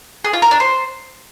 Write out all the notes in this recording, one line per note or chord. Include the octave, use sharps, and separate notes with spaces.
G#4
F4
A#4
D4
C5